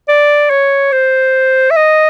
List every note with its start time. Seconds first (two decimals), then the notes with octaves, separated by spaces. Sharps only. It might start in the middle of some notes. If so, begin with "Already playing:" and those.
0.09 D5
0.50 C#5
0.92 C5
1.71 E5
1.76 D#5